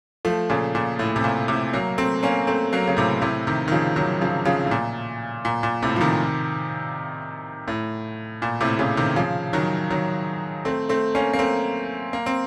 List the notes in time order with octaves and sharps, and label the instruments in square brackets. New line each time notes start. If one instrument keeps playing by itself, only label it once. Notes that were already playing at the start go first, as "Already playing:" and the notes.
[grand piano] F3 A3
A#2 C#3
A#2
A2
C3
A#2
A2 C3
F#3 A#3
A3 C4
A#3 C#4
A3 C4
F#3 A#3
C#3
A2 C3
A2 C3
C3 D#3
D#3
C#3 F3
D#3 F#3
C#3 F3
C#3 F3
A2
A#2
A#2
A#2
A2 C3
F3
C3 D#3
A2
A#2
A2 C3
A#2 C#3
C3 D#3
C#3 F3
D#3 F#3
D#3 F#3
A3 C4
A3 C4
A#3 C#4
A#3
A3 C4
A#3
C4